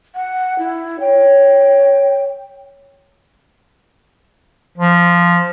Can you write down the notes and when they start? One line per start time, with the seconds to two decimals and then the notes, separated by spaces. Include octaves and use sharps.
0.15 F#5
0.59 E4
1.00 C#5 G5
4.78 F3